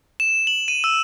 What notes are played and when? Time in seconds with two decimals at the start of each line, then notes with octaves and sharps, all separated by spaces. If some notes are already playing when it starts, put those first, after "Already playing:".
0.20 E7
0.47 F#7
0.68 D#7
0.84 E6